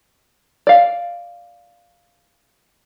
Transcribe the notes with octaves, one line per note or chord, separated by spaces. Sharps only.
D5 F5